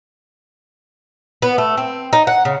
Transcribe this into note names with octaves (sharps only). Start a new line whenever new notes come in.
B3
A3
C4
D#4
F#5
C#3